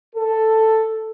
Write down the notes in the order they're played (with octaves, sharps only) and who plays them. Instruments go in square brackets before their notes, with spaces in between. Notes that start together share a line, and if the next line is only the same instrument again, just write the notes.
[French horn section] A4